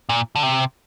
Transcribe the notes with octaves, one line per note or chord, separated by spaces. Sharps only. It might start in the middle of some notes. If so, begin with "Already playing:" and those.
A#2
D3
C3